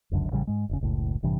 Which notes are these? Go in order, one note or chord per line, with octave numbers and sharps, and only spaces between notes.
F1 C#2 F#2 D3
A1 C#3 G3
G#2 G#3
F1 C#3
F#1 C#2 A2
A1 G2 C3 E3